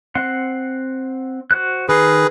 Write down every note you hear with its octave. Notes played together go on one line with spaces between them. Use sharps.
C4 F#5 C6
F#4 C5 F#6
D#3 G#4 A#4 B4 C6